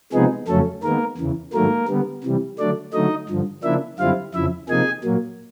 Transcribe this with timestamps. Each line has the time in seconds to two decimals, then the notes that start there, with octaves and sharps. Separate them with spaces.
0.13 C3 F3 G#3 B3 D#4 G#4
0.48 F2 C#3 F#3 A3 C#4 A4
0.83 D#3 G#3 A#3 B3 A#4
1.18 E2 C#3 E3
1.53 G#2 D#3 F#3 A3 A#3 A#4
1.88 D3 G3 B3
2.24 C3 E3 G3
2.59 D3 F#3 A3 D4 D5
2.93 D3 F#3 A3 D#4 D#5
3.29 G2 D3 F3
3.63 C#3 F3 A#3 D4 E4 E5
3.99 F#2 D3 G3 C4 E4 F4 F5
4.34 F2 C#3 F3 E4 E5
4.69 C3 F3 A#3 D#4 G#4 G#5
5.04 A#2 F#3 A#3